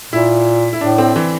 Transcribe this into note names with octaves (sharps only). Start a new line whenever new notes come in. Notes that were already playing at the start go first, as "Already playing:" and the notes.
A#2 E4
E4
A2 D4
C4
E3